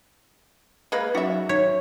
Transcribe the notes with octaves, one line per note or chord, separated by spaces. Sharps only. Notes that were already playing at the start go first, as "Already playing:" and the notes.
G#3 A#3 B4
F#3 C#4 D#4 F#4 E5
D#4 C#5